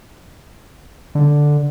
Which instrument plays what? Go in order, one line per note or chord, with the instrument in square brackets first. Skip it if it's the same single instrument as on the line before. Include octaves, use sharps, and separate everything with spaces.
[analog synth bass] D3